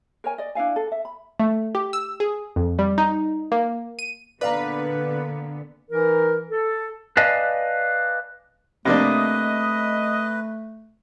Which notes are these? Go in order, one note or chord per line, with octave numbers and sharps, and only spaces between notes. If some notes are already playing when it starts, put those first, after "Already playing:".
A#4 C#5 G#5
D5 D#5
D4 E4 F5 G#5
A4
E5
B5
A3
G4
E6
G#4
F2
G3
D#4
A#3
D#7
A#2 D3 B3 B4 D5 F5 A#5
E3 D#4 A#4
A4
B4 D5 D#5 F5 G#5 A5
C3 A3 A#3 D4 B4 D#5